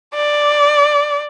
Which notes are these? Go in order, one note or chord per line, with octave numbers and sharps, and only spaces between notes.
D5